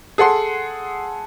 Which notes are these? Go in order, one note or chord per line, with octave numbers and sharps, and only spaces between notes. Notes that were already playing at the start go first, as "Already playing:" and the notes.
G#4 A4 F#5 C6